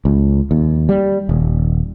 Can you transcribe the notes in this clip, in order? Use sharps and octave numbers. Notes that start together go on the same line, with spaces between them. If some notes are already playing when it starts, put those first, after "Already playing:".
C#2
D#2
G3
D#1